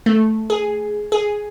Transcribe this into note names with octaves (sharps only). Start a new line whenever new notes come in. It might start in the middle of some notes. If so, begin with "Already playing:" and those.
A3
G#4
G#4